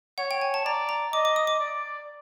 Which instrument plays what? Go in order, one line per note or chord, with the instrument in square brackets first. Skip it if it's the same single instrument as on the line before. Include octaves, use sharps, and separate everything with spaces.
[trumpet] C#5 [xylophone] F#5
[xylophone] G5
G#5
A5
[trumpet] D5 [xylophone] A#5
[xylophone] A#5
[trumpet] D#5 [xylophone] D6
[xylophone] D6
D#6
D6
[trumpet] D5